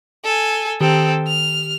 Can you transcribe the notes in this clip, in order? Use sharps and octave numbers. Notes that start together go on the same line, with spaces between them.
A4 G#5
D#3 C4 G4 A4
F6